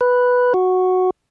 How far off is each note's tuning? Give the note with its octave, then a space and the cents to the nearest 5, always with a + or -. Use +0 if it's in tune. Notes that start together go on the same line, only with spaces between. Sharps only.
B4 +0
F#4 -5